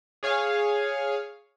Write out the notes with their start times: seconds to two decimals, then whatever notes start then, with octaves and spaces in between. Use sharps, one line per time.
0.23 G#4 C#5 F5